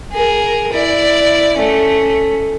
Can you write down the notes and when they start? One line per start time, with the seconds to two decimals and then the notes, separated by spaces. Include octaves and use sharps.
0.12 G#4 A#4
0.73 E4 D5
1.57 A3 C#4